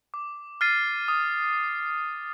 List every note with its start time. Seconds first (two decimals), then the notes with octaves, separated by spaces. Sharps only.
0.14 D6
0.61 F6 A6 C7 D#7
1.08 D#6